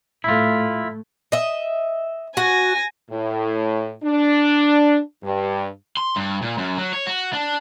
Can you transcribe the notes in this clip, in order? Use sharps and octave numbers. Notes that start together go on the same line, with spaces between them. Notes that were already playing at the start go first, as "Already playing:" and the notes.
A2 A3 E4 F4
D#5 E5
F#4 G#5 A#6
A2
D4
G2
C6
G2
A#2
F#2
F#3
C#5
F#4
D4